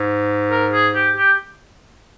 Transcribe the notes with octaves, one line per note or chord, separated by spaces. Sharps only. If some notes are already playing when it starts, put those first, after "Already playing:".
Already playing: G#2
A#4
G#4
G4
G4